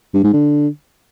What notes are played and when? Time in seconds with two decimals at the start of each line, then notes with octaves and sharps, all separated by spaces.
0.14 G2
0.24 G#2
0.33 D3